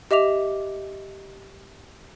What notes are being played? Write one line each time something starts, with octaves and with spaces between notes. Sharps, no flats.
G4 D#5 E5 D6 F7